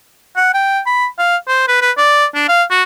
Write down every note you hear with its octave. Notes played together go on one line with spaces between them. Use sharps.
F#5
G5
B5
F5
C5
B4
B4
D5
D4
F5
F#4